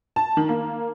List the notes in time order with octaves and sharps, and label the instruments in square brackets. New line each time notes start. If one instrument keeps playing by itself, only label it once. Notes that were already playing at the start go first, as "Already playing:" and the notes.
[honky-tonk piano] A5
D#3
A#3